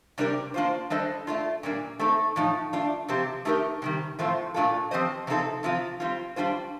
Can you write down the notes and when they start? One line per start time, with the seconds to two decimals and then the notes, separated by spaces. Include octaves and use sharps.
0.18 C3 G3 D4 G4 A#4
0.54 A#3 D4 F4 C5
0.90 G3 D4 A4 C5 D#5
1.27 A3 D4 F4
1.63 A#2 G3 A#3 D4
1.99 A3 C4 D#4 A4
2.36 A2 F3 A3 D#4
2.73 A3 D4 F4
3.08 C3 F3 C4 G4
3.45 A3 D#4 G4 A#4
3.82 C3 D#3 G3
4.19 A2 F3 A3 C4 F4
4.54 A#2 A3 D4 F4 A4
4.91 F3 C4 G4 C5 D#5
5.27 C3 F3 C4 D#4 A4
5.63 C3 F3 C4 F4
6.00 G3 C4 F4
6.36 G3 D4 F4 C5